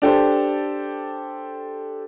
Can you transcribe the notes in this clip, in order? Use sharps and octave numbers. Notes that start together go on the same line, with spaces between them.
D4 G4 A4 C5